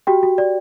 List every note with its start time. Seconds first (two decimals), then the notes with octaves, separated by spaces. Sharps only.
0.07 F#4 G4 G5
0.23 F#4
0.38 D5